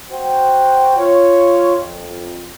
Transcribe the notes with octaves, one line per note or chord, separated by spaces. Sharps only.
F#4 C5 G5
F4 C#5
F2